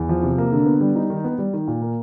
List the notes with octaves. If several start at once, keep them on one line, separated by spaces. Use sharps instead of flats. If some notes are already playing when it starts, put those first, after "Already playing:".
Already playing: E2
F3
C3
A#3
D3
B3
G3
D#4
D#3
B3
G3
D#3
A#2
A#3